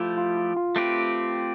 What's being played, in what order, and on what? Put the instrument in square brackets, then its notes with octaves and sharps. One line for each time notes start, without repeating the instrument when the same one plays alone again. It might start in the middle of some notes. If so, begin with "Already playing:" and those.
Already playing: [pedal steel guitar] F3 A3 E4 G4 [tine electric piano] F4
[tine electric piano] F4
F4
F4
[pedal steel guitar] A3 C4 G4 B4